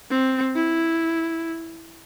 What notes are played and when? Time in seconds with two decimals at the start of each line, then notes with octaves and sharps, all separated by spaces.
0.10 C4
0.56 E4